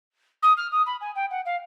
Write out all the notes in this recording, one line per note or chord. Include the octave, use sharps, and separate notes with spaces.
D#6
F6
D#6
B5
G#5
G5
F#5
F5